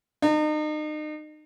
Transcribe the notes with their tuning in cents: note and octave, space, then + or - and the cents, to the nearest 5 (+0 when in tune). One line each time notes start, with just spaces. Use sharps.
D#4 -35